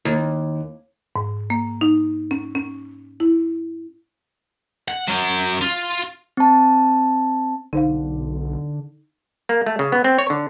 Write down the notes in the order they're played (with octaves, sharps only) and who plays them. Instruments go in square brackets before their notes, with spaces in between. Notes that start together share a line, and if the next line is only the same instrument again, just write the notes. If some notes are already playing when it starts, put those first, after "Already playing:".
[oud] D#2
[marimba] G#2
A#3
D#4
C#4
C#4
E4
[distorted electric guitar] F#5
F#3 C#4
F4
[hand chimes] C4 A5
[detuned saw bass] B1 [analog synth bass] D3 [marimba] D#4 C5 F5
[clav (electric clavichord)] A#3
A3
C#3
B3
C4
C#5
D3